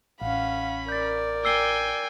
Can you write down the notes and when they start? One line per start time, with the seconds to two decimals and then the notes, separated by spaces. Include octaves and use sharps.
0.22 A1 C#4 F5 F#5 B5
0.89 A#4 D5 G6 A6
1.45 G5 G#5 E6 C7 G7